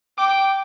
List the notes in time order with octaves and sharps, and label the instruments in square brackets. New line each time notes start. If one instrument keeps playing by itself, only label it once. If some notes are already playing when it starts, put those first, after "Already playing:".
[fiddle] G5 [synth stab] D6